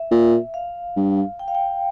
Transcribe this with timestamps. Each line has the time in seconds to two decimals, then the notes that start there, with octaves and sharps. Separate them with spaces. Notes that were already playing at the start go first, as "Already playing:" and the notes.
Already playing: E5
0.11 A#2
0.54 F5
0.96 G2
1.39 G5
1.48 F5
1.55 G5